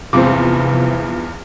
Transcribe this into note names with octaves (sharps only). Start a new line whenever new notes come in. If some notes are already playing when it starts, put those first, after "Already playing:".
E2 G2 C3 E3 F3 C4 D6